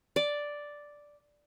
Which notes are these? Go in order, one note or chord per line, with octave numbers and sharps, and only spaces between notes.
D5